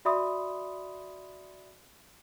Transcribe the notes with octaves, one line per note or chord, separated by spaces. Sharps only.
F#4 D5 E5 B5 C6 D#6